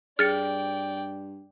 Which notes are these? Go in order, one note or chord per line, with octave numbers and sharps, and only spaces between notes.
G2 G#4 D5 G5 F6 A6 C#7